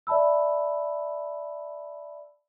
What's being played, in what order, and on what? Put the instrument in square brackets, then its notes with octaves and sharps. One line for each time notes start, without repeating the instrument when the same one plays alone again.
[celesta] D5 E5 A5 B5 E6